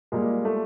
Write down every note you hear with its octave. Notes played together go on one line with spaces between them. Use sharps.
A#2 G3 G#3 A#3
A3